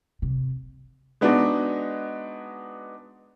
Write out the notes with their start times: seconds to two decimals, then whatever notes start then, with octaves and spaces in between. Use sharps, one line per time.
0.22 C3
1.21 G#3 B3 D4 D#4 F#4